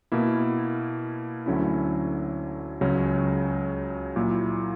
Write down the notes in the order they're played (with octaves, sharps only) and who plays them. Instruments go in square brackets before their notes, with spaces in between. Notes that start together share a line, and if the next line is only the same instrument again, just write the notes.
[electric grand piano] B2 A#3 E4
D2 D3 F#3 C#4 E4
C#2 C#3 F#3 C#4
A#2 F#3 A#3 E4